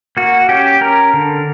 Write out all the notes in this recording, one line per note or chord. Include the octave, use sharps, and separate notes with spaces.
A#3 F#4
C#4 G4
C#4 A#4
D3